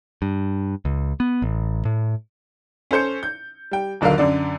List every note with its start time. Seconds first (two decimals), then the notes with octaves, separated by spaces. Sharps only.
0.22 G2
0.85 C#2
1.20 B3
1.42 A1
1.85 A2
2.91 C#4 A4 C5 G6 C#7
3.23 G6
3.71 G3 G5
4.01 D#1 B1 D3 F#3 A#4 F5
4.18 F#2 D3 D5